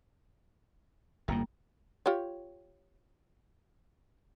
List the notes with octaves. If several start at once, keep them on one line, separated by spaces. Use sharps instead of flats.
G1 F2 A2 G3 A#3
F4 G4 C#5